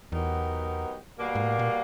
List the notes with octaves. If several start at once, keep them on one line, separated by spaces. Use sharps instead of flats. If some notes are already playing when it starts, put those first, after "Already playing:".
E2 F#3 B3 D#4 G4 A#4
B2 G3 A#3
G#2
A2
A#2